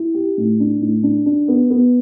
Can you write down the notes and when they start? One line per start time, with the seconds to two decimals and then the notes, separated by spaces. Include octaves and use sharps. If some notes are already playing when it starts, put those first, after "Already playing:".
Already playing: E4
0.14 G4
0.38 A2
0.60 D4
0.81 A2
1.03 D4
1.26 D4
1.48 B3
1.70 B3